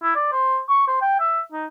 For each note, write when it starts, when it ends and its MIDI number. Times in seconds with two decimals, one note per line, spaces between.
0.03 0.13 64
0.15 0.31 74
0.32 0.58 72
0.69 0.83 85
0.88 0.97 72
1.02 1.19 79
1.20 1.41 76
1.52 1.66 63